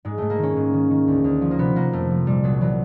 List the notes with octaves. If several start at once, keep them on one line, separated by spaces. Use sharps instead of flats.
G#2 G#3
G#2 A3
A#3
D#3 C#4
G#2
D#3
D#3
D2
D2
F3
A#3
C3 B3
C3 A#3
F2 A3
F3
A#2 G3
C2 F#3
E3 F#3